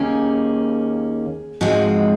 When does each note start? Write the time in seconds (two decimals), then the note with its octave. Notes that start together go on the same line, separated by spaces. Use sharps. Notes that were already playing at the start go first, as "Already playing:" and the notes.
Already playing: D#2 D#3 A#3 C#4 G#4
1.61 G#2 F3 G#3 C4 F#4